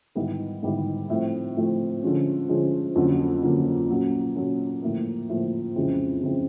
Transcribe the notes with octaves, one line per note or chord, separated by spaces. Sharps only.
G#2 D#3 G3 B3 E4
G#2 D#3 G3 B3 E4
A2 F3 A3 C4
A2 F3 A3 C4
D3 F3 G#3 C#4
D3 F3 G#3 C#4
F2 D3 F#3 A#3 C#4
F2 D3 F#3 A#3 C#4
A#2 F#3 A#3 C#4
A#2 F#3 A#3 C#4
A2 F3 A#3
A2 F3 A#3
F2 C#3 E3 G#3 C4
F2 C#3 E3 G#3 C4